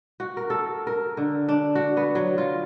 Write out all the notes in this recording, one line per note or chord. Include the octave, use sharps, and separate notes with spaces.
F#4
A#4
A4
A#4
D3
D4
F#4
B3
F#3
F4